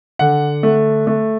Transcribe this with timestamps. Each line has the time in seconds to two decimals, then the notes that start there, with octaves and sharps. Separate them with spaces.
0.19 D3 F#5
0.63 A3
1.07 A3